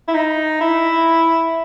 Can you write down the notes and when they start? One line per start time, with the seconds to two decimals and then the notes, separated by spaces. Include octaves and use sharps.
0.08 E4
0.14 D#4
0.61 E4